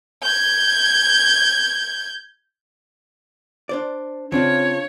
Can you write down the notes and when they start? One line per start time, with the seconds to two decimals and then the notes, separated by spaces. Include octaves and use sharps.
0.23 G6 G#6
3.69 D4 C5 D5
4.32 C#3 C4 D4 F4 C#5